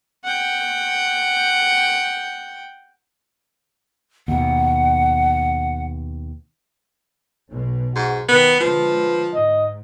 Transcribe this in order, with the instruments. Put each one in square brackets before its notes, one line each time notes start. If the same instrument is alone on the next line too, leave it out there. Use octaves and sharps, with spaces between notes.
[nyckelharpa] F#5 G5
[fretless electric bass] D#2 B2 [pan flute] F#5
[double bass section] B1 B2
[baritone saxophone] G#2 [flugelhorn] F#4
[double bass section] D#3 [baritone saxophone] B3 [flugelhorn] B4
[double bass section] D3 G#3 [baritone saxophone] F3
[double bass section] G#2 [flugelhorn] D#5